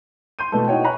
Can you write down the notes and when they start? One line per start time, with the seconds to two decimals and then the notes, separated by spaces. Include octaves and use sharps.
0.39 C6 G6 D#7
0.52 B2 E3 A3 B3 A4
0.68 D#4 E4 F#4 C#5 G5
0.84 C#5 G#5 A#5 B5 C#6 F#6